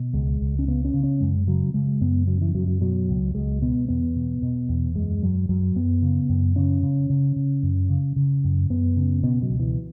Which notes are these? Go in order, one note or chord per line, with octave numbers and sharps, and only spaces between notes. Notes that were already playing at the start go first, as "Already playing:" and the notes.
Already playing: B2
C#2 G#3
C#2
C#4
C#3 B3
C#4
C#3
C#4
F#2 G#3
C#3 F#3
C#3 G#3
F#2 B3
C#3 F#3
E3
F#2 F#3
F#3
B2 F#3
C#2
C#2 G#3
B2 B3
E2 B3
B2
B2
E2
F#2 G#3
F#2 F#3
F#2 F#3
F#2 B3
C#3
F#2
C#3 C#4
C#3
C#3
C#3
F#2
C#3
C#3
F#2
F#2 B3
C#3
B2 B3
F#3
C#2
E3